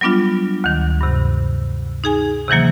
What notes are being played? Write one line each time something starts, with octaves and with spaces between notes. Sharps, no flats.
F#3 G3 B3 D4 F4
D2 D#3
G2 C3
D#4 G#4 G#5
C3 D#3 E3 F#3 A#3